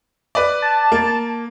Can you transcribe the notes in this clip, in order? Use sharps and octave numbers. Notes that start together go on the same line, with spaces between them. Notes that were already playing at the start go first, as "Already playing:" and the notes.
B4 D5
A5
A#3